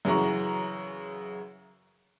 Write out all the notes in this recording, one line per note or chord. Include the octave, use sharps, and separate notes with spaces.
F#2 C#3 E3 F#4 A#5 C#6